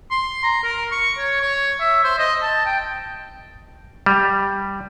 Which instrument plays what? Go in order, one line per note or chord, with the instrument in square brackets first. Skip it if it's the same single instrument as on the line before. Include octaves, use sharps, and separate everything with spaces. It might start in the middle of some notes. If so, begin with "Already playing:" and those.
[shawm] C6
A#5
A#4
C#6
C#5
C#5
E5
C5
D#5
A5
G5
[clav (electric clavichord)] G3